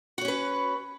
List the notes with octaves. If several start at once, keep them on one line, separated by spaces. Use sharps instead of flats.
C#4 F#4 B4 C#5